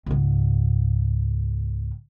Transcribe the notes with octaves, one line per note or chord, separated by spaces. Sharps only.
C#2 G#2